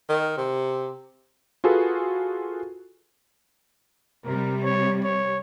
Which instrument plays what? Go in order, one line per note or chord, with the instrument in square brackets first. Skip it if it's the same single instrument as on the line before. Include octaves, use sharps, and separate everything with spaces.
[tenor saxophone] D#3
C3
[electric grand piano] F4 F#4 G#4 A4 B4
[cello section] C3 G3 [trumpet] A#4
[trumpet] C#5
C#5